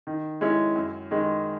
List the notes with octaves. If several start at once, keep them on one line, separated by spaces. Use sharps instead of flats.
D#3
G#3 C#4 E4
F#2
D#3 G#3